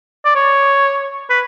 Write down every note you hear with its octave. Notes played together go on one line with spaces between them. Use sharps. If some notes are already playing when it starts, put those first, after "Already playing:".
D5
C#5
B4